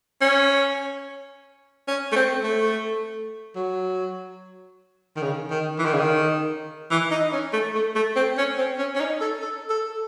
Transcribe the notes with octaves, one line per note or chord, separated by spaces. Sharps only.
C#4
C#4
A3
C4
A3
F#3
D#3
C#3
D#3
E3
D#3
C#3
D#3
E3
D#4
C#4
A3
A3
A3
C4
C#4
C4
C#4
C#4
D#4
A4
A4
A4